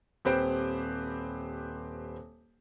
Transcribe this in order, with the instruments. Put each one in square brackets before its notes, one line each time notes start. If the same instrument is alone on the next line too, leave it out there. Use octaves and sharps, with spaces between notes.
[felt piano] D#1 C4 G4 B4 C5 D7